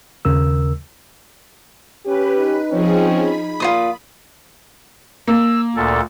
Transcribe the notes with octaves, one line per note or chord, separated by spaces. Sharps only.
D#2 C#3 A#4 E6
C#4 G4 B4
D#4
F3 C4 C#4 G#4
B5
A#2 F4 C5 D#6
A#3 E6
D2 A#2 A4